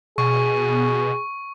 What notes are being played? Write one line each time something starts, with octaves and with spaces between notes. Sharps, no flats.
B2 G#4 C#6